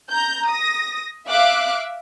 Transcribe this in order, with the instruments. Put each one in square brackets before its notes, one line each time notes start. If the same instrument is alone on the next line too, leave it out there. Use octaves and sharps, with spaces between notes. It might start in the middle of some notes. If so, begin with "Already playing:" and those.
[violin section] A#5 G6
D#6 A#6
E5 F5 D6 F#6